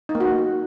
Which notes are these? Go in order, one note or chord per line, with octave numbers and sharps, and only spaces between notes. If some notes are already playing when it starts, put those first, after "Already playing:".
D#4
A#3
F#4